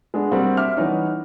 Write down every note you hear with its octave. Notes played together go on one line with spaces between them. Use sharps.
G#3 B3 D4
G3 A#3 C4 D4 F#4
E5 D6 F6
E3 G3 B3 C#4 D#4